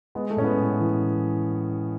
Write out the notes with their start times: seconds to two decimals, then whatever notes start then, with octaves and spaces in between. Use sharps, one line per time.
0.15 G#3 B3
0.30 A3
0.36 A2 C#4
0.44 B3
0.58 A2
0.80 E3